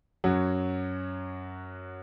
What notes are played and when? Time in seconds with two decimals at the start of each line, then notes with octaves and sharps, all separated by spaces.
0.24 F#2 F#3